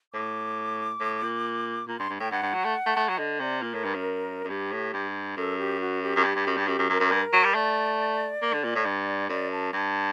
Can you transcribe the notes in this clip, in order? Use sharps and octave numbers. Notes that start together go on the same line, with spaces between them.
A2 D6
A2
A#2
A#2 A#5
G2 C6
G2
A2 G5
G2 F#5
G2
F#3
A3
A3
A3
F#3
D3 D#5
C3 D5
A#2 A#4
A2
G2
F#2
F#2
G2 G4
A2
G2
F#2 A4
G4
F#4
G4
F#2
G2
G2
F#2
G2
F#2 G4
F#2
F#2 A#4
F#2
G2
F#3
G3
A3 D5
A#3
D3
A#2
A2
G2
F#2 D5
A5
G2 A5